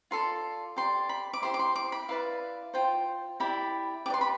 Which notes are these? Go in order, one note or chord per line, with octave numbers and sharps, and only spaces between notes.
F4 A4 D5 C6
G4 D5 C6
B5
D6
E4 G4 C5 C6
D6
C6
D6
B5
E4 B4 D5 F5
F4 C5 G5
E4 G4 D5 B5
G4 B4 D5 D6
C6
B5